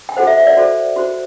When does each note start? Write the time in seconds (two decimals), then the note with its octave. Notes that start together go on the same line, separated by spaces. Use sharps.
0.09 G5
0.17 F#4 A4 C5 F#5
0.27 E5
0.37 E5
0.47 D5
0.57 F#4 A4 C5
0.96 F#4 C5